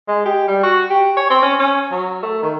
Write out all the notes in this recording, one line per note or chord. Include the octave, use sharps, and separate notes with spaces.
G#3
G4
G3
F#4
G4
C#5
C4
C#4
C#4
F#3
A3
D#3